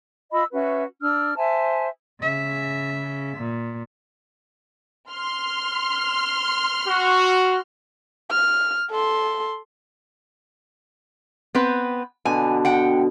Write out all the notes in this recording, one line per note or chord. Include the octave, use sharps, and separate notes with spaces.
F4 D#5 B5 E6
C#4 F#4 B4 E5
D4 E6 F6
C5 E5 G#5 A5
C#3 E5
A#2
C6 F6
F#4
F6
A4 C6
B3 C4 B4
B2 D3 G#5
F#5 G5